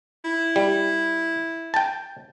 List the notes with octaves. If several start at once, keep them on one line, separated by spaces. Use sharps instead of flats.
E4
G3
G5 A5